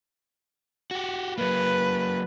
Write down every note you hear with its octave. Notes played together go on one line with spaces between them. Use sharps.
F#4 G4
F#3 A#3 B4